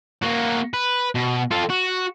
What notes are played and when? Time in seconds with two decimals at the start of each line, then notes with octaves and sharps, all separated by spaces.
0.23 A#3 F#4
0.74 B4
1.15 B2
1.51 F4 A4
1.70 F#4